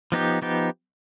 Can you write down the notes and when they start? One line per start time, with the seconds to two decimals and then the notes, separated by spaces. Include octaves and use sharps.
0.12 F3 B3 D#4 G4
0.42 F3 B3 D#4 G4